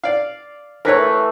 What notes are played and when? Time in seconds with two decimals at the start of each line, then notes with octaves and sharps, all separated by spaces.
0.04 D5 F5
0.85 E3 A3 A#4 B4 C#5